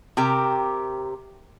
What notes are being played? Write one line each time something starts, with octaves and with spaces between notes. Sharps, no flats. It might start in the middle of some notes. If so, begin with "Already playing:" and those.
C3 G4 A#4